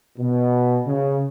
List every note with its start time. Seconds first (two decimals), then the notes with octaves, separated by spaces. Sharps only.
0.18 B2
0.87 C#3